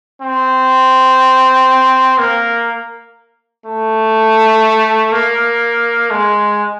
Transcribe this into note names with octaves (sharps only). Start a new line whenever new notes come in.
C4
A#3
A3
A#3
G#3